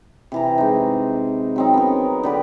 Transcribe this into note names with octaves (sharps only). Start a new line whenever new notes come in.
C3 E3 A#5
G#3 D#4
F#3 C4 D#4
B3 C#4 A#4
D3 G4 B4